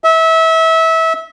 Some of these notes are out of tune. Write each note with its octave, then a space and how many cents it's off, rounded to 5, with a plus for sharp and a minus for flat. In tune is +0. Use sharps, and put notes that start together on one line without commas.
E5 -25